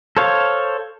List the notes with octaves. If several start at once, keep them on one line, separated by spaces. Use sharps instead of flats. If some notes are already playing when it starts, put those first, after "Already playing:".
A4 C5 C#5 F5